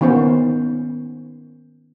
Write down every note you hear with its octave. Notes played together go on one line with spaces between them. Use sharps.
D#3 B3 C#4 C5